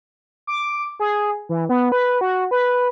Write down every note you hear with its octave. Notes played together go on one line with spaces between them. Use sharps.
D6
G#4
E3
B3
B4
F#4
B4